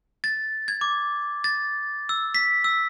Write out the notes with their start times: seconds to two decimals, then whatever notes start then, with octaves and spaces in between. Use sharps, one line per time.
0.24 A6
0.68 G#6
0.81 D6
1.44 A6
2.09 E6
2.35 B6
2.64 E6